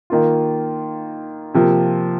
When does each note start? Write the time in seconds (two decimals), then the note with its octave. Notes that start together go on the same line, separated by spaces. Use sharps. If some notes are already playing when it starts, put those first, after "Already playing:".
0.10 D#3 A#3 F4
1.54 C3 F3 A#3 F4